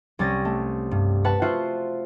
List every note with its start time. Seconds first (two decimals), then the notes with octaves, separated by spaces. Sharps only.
0.19 C2 G3 C#4 A6 A#6
0.45 A3
0.91 G2
1.25 B4 F#5 A5
1.42 F4 F#4 C5 E5 F#5